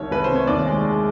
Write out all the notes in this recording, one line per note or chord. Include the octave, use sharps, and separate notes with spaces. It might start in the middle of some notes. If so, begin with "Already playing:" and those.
Already playing: C2 D#3 C#5
C2 B4
C5
C3
C#5
D#2 D5
G#3
G#3